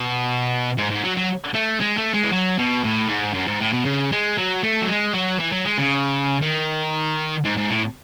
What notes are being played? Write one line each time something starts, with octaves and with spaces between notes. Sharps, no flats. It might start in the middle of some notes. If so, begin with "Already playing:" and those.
Already playing: B2
G#2
G#2
F#3
F#3
A3
G#3
A3
G#3
E3
F#3
B2
A2
G#2
F#2
G#2
A2
B2
C#3
G#3
F#3
A3
F#3
G#3
F#3
E3
F#3
G#3
C#3
D#3
G#2
G#2
A2